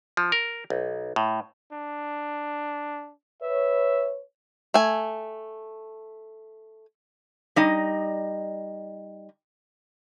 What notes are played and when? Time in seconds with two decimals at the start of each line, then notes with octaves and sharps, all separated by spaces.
0.17 F3
0.32 A#4
0.70 B1
1.16 A2
1.72 D4
3.42 B4 C#5 E5
4.74 A3 G#5
7.56 G3 D#4 D#5